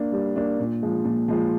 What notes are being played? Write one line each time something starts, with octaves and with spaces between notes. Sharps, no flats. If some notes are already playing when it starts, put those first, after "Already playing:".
Already playing: A#3 D4
G3
A#3 D4
A#2
F3 G#3
A#2
F3 G#3